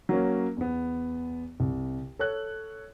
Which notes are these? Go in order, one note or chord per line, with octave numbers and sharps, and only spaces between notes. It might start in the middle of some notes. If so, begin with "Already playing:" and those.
F#3 A#3 C#4
E2 B3
C2
A4 C#5 F#6